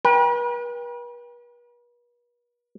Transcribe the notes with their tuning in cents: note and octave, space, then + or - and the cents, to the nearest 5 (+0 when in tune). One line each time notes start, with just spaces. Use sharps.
B4 -45 G5 +25